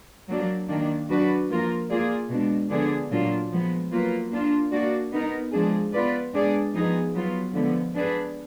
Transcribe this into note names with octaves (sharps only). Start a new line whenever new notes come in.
F#3 A#3 D4
D#3 A#3 D4
F#3 D4 F#4 B4 D5
F3 A#3 F4 A#4
A#3 F4 G#4 D5
B2 G#3 D4
D3 F3 B3 D4 G#4
A#2 F#3 A#3 D4 F4
F3 G#3 B3
F#3 A#3 F4 B4
A#3 D4 F4
A#3 D4 F#4 D5
B3 D#4 A#4
F3 G#3 D4 G#4
B3 F4 B4 D5
G#3 B3 D4 G#4 D5
F3 B3 D#4 G#4
F#3 B3 F4
D3 F3 G#3 B3
B3 D4 G#4 B4